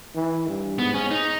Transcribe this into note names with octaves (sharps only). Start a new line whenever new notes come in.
E3
G2
G#2 B3
C#4
D#4